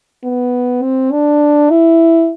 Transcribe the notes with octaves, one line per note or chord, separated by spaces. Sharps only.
B3
C4
D4
E4